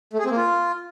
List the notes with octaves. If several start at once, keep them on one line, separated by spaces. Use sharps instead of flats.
A3
G#4
C4
A#3
F4